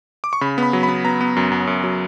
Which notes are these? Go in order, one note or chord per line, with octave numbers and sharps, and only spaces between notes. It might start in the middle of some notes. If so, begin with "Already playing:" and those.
D6
C#6
C#3 B5
B3 B5
F#3
B5
B3
B3 A#5
B3
F#2
F#2
F#2
F#3